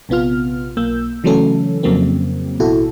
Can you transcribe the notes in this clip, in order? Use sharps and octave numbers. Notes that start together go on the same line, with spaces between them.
A#1 C3 B3 F4 F6
B1 A#3 E6 G6
C#3 E3 F#3 A3 C#4 A4
F2 C#3 F#3 A#3 C4
A1 B2 E4 F#4 A4